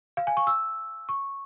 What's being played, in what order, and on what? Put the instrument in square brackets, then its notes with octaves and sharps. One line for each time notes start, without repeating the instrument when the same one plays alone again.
[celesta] F5
G#5
C#6
E6
C#6